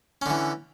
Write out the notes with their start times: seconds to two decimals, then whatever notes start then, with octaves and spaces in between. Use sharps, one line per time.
0.22 C#4
0.26 D3
0.30 E3